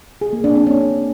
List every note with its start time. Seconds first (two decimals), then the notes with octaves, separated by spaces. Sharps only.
0.21 G#4
0.33 A#3
0.44 D4
0.55 C4
0.67 C#4